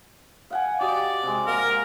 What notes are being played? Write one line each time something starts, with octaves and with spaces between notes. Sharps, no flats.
F5 F#5 G#5
F#4 G4 D5 D#5
C3 G#3
A#3 A#4